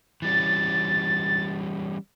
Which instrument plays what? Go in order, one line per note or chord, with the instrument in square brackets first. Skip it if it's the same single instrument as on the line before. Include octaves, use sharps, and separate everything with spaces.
[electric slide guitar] E3 G3 C#4 [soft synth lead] A6